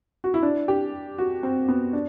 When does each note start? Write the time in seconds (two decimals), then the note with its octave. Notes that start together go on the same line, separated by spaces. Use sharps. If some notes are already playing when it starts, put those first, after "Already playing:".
0.24 F#4
0.34 E4
0.43 D4
0.68 G4
1.18 F#4
1.43 C4
1.68 B3
1.93 D4